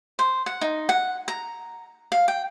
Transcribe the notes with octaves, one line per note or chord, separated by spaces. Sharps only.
C5
F#5
D#4
F#5
A#5
F5
G5